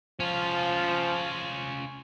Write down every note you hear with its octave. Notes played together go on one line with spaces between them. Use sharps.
F3 C#4 F4